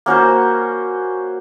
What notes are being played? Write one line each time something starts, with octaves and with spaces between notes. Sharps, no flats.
A#3 C#4 F#4 C5